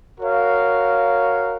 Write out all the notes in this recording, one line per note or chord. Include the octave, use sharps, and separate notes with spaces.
F#4 A#4 C#5 F5